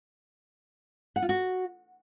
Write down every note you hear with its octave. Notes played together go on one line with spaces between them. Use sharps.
F#5
F4
F#4